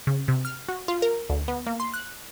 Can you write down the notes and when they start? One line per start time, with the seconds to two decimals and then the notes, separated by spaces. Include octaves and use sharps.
0.07 C#3
0.28 C3
0.45 F6
0.69 F#4
0.88 F4
1.02 A#4
1.30 D2
1.48 B3
1.67 A#3
1.80 C6
1.94 F#6